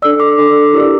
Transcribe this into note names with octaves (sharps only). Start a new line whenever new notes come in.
D4 A4 D5 E6
D6
D4 A4 D5
E4 G4 A#4 D5